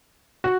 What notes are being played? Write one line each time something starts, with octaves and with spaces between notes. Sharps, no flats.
F#4